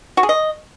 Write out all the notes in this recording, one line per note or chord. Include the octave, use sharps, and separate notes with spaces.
F#4
G#4
D#5